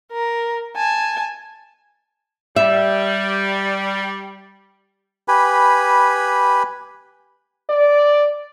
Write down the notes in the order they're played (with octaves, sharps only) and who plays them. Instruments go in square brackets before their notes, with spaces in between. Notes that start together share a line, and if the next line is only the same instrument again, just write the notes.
[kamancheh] A#4
G#5 A5
[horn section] G3 [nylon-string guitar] E5
[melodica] G4 B4 G#5 B5
[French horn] D5